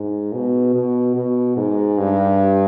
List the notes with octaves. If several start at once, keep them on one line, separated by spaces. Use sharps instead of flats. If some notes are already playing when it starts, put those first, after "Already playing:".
Already playing: G#2
B2
B2
B2
G#2
G2